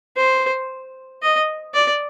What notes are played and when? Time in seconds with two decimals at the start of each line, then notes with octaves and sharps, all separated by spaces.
0.17 C5
1.22 D#5
1.74 D5